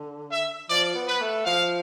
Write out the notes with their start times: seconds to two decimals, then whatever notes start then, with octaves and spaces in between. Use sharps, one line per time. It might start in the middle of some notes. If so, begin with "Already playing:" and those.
Already playing: D3
0.32 E5
0.70 F3 D5
0.95 B3
1.08 B4
1.21 A3
1.45 F3 F5